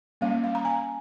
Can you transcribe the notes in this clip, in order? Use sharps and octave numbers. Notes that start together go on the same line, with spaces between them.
G3 A#3 C#4 F5
F5
A#5
G#5